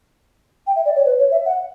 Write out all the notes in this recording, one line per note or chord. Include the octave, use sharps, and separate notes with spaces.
G5
E5
D5
C#5
B4
C#5
E5
F#5